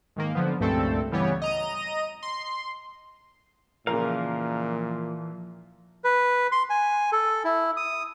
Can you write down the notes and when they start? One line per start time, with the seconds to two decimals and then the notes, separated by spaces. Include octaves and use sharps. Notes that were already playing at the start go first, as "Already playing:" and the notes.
0.16 G#2 D#3 A#3
0.35 D3 F3 B3
0.60 C#2 G2 A#2 A3 C4 A4
1.12 C#3 E3 G3 B3 G4 C#5
1.42 D#5 A#5 D#7
2.23 C6
3.87 A#2 C#3 E3 F3 A#4 F5
6.04 B4
6.52 C6
6.70 G#5
7.12 A4
7.44 E4
7.77 D#6